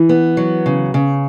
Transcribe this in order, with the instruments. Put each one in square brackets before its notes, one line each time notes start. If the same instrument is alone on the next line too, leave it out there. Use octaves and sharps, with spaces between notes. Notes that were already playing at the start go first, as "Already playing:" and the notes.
Already playing: [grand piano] E3
[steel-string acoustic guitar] B3
F#3
C#3
C#3